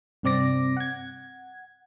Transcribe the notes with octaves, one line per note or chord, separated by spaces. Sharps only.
G2 C3 C4 D5 D6 A#6
F#5 G#6